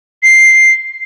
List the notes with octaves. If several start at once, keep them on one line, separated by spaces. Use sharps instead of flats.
C7